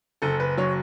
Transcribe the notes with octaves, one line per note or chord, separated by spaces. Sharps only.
F#1 A4
B4
F#3 C#5